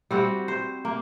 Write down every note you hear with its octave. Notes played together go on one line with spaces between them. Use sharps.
G3 C4 F#4
C5
A#3